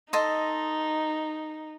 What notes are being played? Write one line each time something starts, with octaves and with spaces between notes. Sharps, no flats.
D#4 A4 D#5 C6